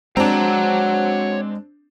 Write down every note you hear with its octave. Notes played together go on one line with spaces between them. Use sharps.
G#3 C4 D4 F#4 C#5 A#5